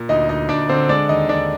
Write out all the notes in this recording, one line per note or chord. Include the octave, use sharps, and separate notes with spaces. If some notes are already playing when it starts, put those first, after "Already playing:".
Already playing: A#2
D2 D#4 D#5
D2 D#4 D#5
D2 D4 D5
D3 C4 C5
G#3 D4 D5
D#2 D#4 D#5
D#2 D4 D5